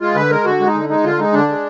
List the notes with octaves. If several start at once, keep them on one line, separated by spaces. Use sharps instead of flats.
G#3 F4
D3 B4
G#3 A#4
D3 F#4
G#3
D#4
D3
G#3 D#4
D3 F4
G#3 D#4
D3 D4
G#3